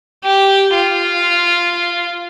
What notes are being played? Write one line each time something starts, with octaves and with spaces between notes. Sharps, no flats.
G4
F4